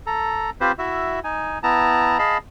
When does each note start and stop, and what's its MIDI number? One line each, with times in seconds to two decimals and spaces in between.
0.07 0.50 69
0.07 0.50 82
0.61 0.72 60
0.61 0.72 65
0.61 0.72 67
0.61 0.72 71
0.61 0.72 72
0.79 1.20 64
0.79 1.20 66
0.79 1.20 76
1.24 1.59 63
1.24 1.59 80
1.63 2.18 59
1.63 2.18 64
1.63 2.18 81
1.63 2.18 82
2.19 2.38 68
2.19 2.38 75
2.19 2.38 77
2.19 2.38 81
2.19 2.38 83